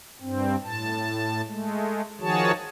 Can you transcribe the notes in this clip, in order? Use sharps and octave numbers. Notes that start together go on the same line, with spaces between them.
G2 C4
A2 A5
G#3 A3
D#3 F3 F#4 G#4 C#5 A5